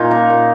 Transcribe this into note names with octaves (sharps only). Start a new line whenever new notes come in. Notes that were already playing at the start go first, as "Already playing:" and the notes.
Already playing: A#2 C#4 D#4 F4
A#3 A#4
A#2